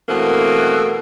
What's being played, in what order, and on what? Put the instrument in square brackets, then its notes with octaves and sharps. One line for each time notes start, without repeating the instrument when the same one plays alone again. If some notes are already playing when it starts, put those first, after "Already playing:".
[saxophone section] B2 E3 A3 A#3 C4